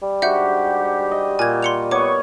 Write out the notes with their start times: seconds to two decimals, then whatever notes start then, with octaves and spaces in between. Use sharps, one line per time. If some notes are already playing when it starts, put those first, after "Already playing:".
0.02 G3
0.22 G#2 D4 F#4 G4 E5 F#5 G6
1.11 D#5
1.39 A#2 G#5 G#6
1.63 C6 C#7 F7
1.91 B3 C#5 C#6 D6